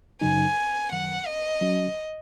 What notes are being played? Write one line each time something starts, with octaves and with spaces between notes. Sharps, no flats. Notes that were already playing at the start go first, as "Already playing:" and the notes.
F#2 C#3 F#3 D#4 G#5
F#2 D#3 F#3 F#5
D#5
F#3 C#4 F#4